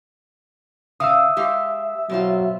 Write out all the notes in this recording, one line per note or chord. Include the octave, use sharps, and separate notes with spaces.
C#3 E5 F5 D#6 E6
G#3 G4 F5
B2 F#3 C4 F4